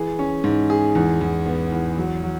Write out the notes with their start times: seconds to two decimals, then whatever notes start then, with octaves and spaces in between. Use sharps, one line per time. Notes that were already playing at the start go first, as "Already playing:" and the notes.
Already playing: E3 G#4
0.19 C#4
0.44 G#2
0.70 G#4
0.95 E2
1.21 E2
1.46 B3
1.72 E2
1.97 F#3
2.23 F#3